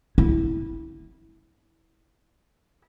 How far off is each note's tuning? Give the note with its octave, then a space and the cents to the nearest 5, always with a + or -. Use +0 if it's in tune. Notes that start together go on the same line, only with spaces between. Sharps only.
E4 -25